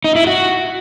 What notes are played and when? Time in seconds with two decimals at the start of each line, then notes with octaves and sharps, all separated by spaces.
0.04 D#4
0.16 E4
0.27 F#4